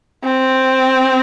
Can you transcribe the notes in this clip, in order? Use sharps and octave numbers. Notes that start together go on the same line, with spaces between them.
C4